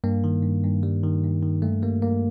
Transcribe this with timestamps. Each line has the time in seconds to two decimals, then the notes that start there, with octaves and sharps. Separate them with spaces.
0.04 G2 A#3
0.24 D#3
0.43 G2
0.63 G2
0.83 G3
1.03 D#3
1.23 G2
1.43 D#3
1.62 G2 A3
1.82 G3 A#3
2.02 G2 A#3